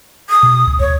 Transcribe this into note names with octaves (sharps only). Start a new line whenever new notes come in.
D#6
B2
D2
D2 C#5